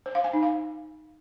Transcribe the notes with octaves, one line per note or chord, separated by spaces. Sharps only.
C5
F5
G#5
D#4
F5